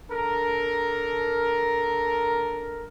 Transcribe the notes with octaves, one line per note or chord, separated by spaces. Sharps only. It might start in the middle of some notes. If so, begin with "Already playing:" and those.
D4 A4 A#4